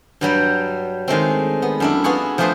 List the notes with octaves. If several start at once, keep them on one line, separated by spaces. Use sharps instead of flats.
G2 F#3 G3 G5
D#3 G#3 A3 C4
B3
F#2 D4 E4
B3 F4 F#4 G#4 C#5
F3 A3 D4 G#4 B4 C5